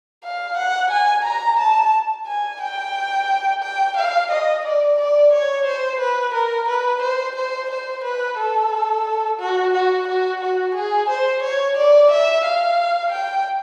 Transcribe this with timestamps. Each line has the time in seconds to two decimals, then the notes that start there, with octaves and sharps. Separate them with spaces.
0.24 F5
0.57 F#5
0.91 G#5
1.25 A#5
1.60 A5
2.27 G#5
2.62 G5
3.63 G5
3.97 F5
4.31 D#5
4.65 D5
4.99 D5
5.33 C#5
5.66 C5
6.00 B4
6.34 A#4
6.68 B4
7.02 C5
7.36 C5
7.71 C5
8.04 B4
8.38 A4
9.40 F#4
9.74 F#4
10.08 F#4
10.41 F#4
10.75 G#4
11.10 C5
11.43 C#5
11.77 D5
12.11 E5
12.45 F5
13.12 G5